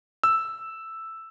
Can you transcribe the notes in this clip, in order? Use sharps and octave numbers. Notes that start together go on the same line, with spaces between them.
E6